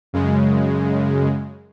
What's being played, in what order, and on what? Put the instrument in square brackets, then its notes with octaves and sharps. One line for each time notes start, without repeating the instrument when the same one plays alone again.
[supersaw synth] F#2 C#3 G#3